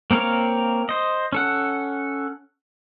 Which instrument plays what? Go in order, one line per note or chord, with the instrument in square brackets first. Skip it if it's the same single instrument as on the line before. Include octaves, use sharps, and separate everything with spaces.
[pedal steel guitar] A#3 C4 A#4 C#5 F5
C5 D#5
C#4 A4 F#5